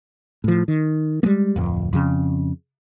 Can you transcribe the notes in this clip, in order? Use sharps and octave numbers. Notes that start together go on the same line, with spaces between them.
A2 F3
D#3
G3 G#3 A#3
D1 F2
F2 C#3